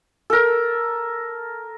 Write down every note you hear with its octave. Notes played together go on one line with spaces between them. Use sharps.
A4 A#4